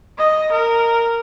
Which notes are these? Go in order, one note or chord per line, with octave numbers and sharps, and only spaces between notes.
D#5
A#4